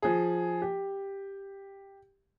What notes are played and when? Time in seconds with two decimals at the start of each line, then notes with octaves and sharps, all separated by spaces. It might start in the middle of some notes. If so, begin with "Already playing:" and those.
0.02 F3 G#4
0.62 G4